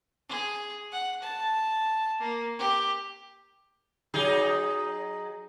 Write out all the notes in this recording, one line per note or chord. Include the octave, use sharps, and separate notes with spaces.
G#4
F#5
A5
A#3
G4
F#3 D#4 G#4